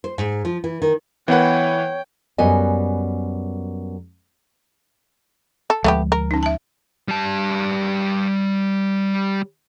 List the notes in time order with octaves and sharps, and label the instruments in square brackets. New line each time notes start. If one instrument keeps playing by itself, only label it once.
[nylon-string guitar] C5
G#2
F3
E3
D#3
[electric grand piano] E3 F#5 [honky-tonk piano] B3 B4 [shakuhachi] C#5 [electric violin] G5
[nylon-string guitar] F#2 G3 B3 D#5 G#5
[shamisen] A4
[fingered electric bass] D2 F3 G#3 [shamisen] A3 B3 G4
[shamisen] A#4
[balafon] C#4 D#4
E5 A5
[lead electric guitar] G3 A5